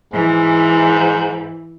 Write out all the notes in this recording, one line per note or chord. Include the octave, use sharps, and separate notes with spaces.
G#2 E3